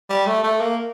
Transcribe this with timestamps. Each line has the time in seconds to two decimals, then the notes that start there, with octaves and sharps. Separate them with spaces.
0.10 G3
0.27 A3
0.44 A3
0.61 A#3